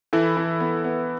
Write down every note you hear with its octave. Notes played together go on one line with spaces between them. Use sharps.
E3 E4 A4
E3
B3
B3